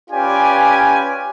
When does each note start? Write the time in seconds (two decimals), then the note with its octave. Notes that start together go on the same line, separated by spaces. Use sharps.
0.10 C#4 F4 G4 B4 D5 G#5